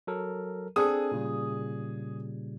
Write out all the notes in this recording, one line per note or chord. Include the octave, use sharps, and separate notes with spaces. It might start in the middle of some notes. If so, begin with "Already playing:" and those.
F#3 A4 A#4
C4 D4 G#4 A4 D#6
A#2 C#3 G3